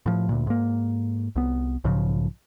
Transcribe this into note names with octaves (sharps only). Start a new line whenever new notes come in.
A2 F3
D2 A#2
G#2 A#3
C2 B3
B1 G#2 C#3 F3